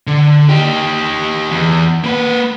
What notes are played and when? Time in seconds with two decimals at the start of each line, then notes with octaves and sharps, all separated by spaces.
0.07 D3
0.49 D#4 G4
1.51 E2
2.04 A#3 B4